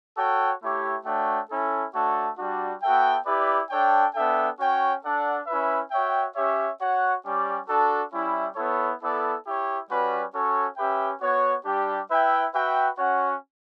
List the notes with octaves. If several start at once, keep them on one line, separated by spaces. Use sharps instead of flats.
F#4 A4 C#5 G5
A3 E4 G4 C#5
A3 D4 F#4 C#5 G5
C#4 E4 A4
A3 D4 F#4 A4 C#5
G3 D4 F#4
B3 F#4 A4 E5 G5
E4 G4 B4 D5
D4 A4 C#5 G5
B3 D4 A4 E5 G5
C#4 F#4 C#5 G5
D4 A4 D5 F#5
C#4 E4 B4 E5
F#4 C#5 E5 G5
C#4 G4 C#5 E5
F#4 C#5 F#5
G3 C#4 G4 D5
D4 F#4 A4
G3 C#4 E4
B3 E4 A4 C#5
B3 E4 A4 D5
E4 G4 C#5
G3 C#4 F#4 B4 D5
C#4 F#4 A4 C#5
C#4 G4 B4 E5 G5
B3 F#4 C#5
G3 D4 G4
E4 B4 E5 G5
F#4 B4 E5 G5
C#4 F#4 C#5 F#5